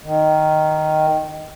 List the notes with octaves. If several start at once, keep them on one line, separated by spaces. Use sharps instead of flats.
D#3